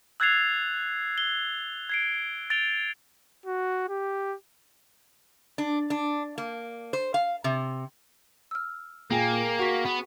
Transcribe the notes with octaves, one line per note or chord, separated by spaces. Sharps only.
E6 F#6 G#6 A6 C7 F7
G7
G#6 C7 D7
A6 D7 F7 G7
F#4
G4
D4
D4
A#3
C5
F5
C3
E6 F6
A#2 A#3 G#4 G5 G#5
F#4 F#5 C#6 B6
B3